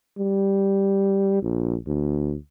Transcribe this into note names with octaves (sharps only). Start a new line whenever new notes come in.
G3
A#1
D2